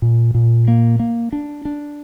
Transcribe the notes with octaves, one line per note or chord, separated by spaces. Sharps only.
A#2
A#2
A#3
A#3
D4
D4